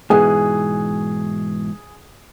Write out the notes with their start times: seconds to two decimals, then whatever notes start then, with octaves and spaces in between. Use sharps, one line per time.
0.10 G#2 B2 E3 G#4